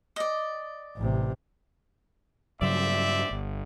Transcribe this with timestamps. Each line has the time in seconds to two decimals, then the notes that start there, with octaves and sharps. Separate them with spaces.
0.16 D5 D#5
0.97 A1 C3
2.62 G2 C#3 F#3 C5 D5 E5
3.31 G1